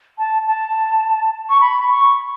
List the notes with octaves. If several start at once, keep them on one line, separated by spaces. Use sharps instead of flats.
A5
A5
C#6
B5
C#6